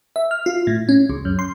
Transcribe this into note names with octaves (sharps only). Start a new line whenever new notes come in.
E5
F6
F4
A2
C#4
C#2
F#2
C6